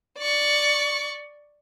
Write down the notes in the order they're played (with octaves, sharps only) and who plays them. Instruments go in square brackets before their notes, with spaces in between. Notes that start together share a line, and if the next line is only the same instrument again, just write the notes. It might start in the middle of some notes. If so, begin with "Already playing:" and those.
[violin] D5 C#6